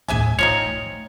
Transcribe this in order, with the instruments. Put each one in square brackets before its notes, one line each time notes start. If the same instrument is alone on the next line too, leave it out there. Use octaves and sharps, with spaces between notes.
[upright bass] D#2 A2 [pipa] G#4 E5 G#5
[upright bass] A1 [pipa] F3 C4 D#4 [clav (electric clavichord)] C#5
[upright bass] A3